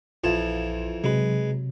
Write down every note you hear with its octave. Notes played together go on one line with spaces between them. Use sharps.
A#1 F2 E3 F4 A5
C3 F#3 G#3 B4